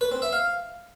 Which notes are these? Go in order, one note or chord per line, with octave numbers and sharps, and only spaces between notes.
B4
C4
E5
F5